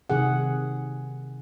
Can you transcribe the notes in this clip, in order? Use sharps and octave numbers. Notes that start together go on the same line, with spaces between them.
C3 D#3 G#4 F#5